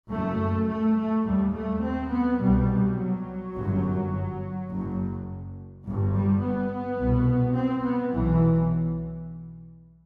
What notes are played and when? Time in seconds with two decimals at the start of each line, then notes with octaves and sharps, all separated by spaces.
0.12 F#1 F#2 A3
0.70 A3
0.98 A3
1.27 D#2 G3
1.55 A3
1.83 C4
2.12 B3
2.41 C2 B2 G3
2.98 F#3
3.56 G1
3.61 F#2
4.71 F#1 F#2
5.86 G1 G2
6.13 G3
6.42 B3
6.99 C2 B2
7.57 C4
7.85 B3
8.14 B1 B2 E3